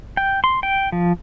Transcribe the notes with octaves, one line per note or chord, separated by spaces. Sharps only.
G5
C6
G5
F3